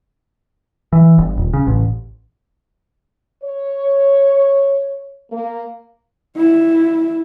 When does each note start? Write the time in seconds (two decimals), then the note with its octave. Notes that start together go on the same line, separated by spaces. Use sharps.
0.93 E3
1.18 G1
1.38 D#1
1.53 C#3
1.67 A1
3.44 C#5
5.31 A#3
6.37 E4